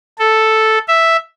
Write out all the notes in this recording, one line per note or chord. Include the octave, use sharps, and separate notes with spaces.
A4
E5